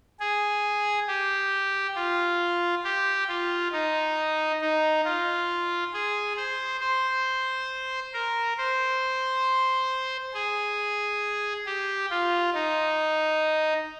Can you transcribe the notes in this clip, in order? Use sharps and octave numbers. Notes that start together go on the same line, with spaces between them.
G#4
G4
F4
G4
F4
D#4
D#4
F4
G#4
C5
C5
A#4
C5
G#4
G4
F4
D#4